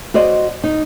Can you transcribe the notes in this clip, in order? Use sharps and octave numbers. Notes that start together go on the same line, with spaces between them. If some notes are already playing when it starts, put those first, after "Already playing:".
F#4 C5 D5 D#5
D#4